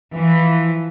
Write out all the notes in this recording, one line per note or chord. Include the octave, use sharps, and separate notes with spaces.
E3 F3